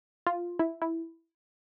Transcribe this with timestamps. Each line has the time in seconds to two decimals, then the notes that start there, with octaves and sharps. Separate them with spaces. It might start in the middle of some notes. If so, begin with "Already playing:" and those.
0.27 F4
0.59 E4
0.82 E4